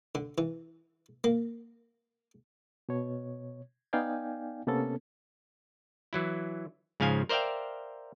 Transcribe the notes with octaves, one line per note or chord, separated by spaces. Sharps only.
D3
E3
A#3
B2 C#5
B3 D#4 D5 F5 G5 G#5
C3 A#3 B3 C#4 A4
E3 F#3 E4
G#2 C#3 F3 F5 G#5
A#4 C5 D5 E5 F5 G5